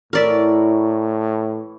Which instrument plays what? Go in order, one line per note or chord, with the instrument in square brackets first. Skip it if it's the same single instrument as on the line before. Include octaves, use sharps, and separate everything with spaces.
[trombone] A2 [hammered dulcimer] E3 C#5 [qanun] A#4 D5 E5